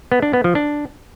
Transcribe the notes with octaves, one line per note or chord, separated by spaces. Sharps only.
B3
D4
B3
F3
D4